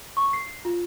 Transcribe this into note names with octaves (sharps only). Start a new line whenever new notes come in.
C#6
C7
F4